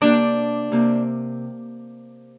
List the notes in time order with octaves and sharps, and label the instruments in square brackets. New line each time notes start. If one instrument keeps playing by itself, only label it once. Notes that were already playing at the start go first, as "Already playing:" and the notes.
[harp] C3 A#3 G4 [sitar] D4
[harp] C3 A#3 G4